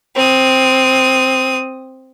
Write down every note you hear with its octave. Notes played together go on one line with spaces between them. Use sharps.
C4 D#6